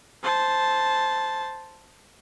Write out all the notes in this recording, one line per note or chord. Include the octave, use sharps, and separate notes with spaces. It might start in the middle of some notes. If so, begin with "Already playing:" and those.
C5 A5